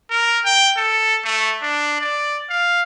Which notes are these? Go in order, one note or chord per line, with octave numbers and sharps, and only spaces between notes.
A#4
G5
A4
A3
D4
D5
F5